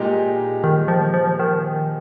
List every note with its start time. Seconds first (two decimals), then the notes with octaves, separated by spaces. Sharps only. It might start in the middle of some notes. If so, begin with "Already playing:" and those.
Already playing: A#2 G#3 D#4 G4
0.64 D#3
0.88 F3
1.14 F3
1.39 D#3